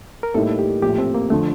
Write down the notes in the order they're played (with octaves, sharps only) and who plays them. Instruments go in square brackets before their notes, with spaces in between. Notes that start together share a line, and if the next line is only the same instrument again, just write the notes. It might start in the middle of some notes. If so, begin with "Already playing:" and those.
[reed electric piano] A#4
[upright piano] A2 G3 A#3 D#4 [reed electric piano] A4
[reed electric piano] G4
[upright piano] A#1 A2 F3 [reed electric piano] G4
[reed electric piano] C4
A#3
[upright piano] D3 F3 [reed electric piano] A3